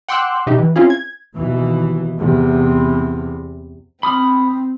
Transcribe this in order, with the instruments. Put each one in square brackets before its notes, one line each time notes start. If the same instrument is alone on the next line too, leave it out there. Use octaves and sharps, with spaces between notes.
[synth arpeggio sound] F#5 G5 C6 D6 E6 F#6
B2 D#4 E4 G4
E3
C4 C#4 E4 F4 G#4
G#6
[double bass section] D#2 B2 E3
E2 C3
[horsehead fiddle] C4 [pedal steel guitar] B5 D#6 F6